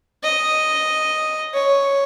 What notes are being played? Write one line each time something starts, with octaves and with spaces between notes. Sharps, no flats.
D#5
C#5